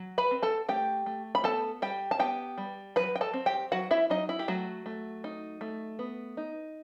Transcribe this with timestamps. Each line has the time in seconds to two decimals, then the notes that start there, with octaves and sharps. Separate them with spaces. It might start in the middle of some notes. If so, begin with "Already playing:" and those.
Already playing: F#3
0.18 B4 B5
0.31 C4
0.43 A4 A5
0.69 A3 G4 G5
1.06 A3
1.35 B5
1.44 B3 A4 A5
1.82 G3 G4 G5
2.11 A5
2.19 B3 G4 G5
2.58 G3
2.96 F#3 B4 B5
3.16 G5
3.21 A4 A5
3.34 C4
3.46 G4 G5
3.72 F#3 F#4 F#5
3.91 E4 E5
4.10 F#3 D#4 D#5
4.29 E4
4.39 G4
4.48 F#3 A3 F#4
4.86 A3
5.24 D#4
5.61 A3
5.99 B3
6.37 D#4